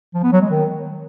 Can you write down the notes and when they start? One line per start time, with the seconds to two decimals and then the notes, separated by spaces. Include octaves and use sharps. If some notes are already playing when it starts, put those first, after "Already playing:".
0.14 F3
0.23 B3
0.32 F#3
0.41 G#3
0.51 D#3